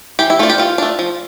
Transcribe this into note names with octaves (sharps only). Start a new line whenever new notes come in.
E3 G4
E4
A3 D4 F4
G4
E3 F4
A3 D4
F3